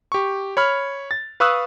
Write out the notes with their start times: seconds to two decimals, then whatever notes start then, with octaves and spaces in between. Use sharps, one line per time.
0.12 G4 C#6
0.57 C#5 B5 F6
1.11 A6
1.40 B4 F5 C#6 D#6 E6 F#6